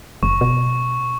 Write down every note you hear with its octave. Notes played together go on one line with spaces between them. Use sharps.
F#1 C#6
B2